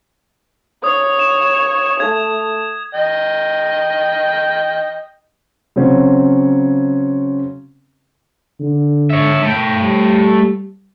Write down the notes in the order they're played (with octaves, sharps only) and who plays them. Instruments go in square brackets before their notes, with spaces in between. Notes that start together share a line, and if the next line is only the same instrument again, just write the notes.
[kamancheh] C#5 [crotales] D#6
[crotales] E7
[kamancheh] A3 [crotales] G#6
[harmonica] D#5 G5
[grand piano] C#3 F#3 C4 C#4
[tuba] D3
[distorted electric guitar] C#5 E5
A3 G5
[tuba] G3